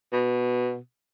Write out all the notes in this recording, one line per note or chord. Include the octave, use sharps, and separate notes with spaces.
B2